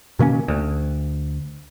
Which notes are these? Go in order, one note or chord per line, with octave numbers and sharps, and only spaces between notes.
B2 D#3 A#3 C#4
D2